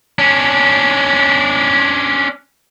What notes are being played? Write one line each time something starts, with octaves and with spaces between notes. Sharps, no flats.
C#4 D4